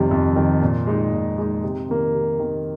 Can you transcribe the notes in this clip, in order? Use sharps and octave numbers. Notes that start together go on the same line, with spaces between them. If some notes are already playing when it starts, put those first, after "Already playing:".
Already playing: F2 C3 D#3 G3
F2
C3 D#3 G3
A#2
G#3 D#4
A#2
G#3 D#4
C3
D#3 A#3
C3
D#3 A#3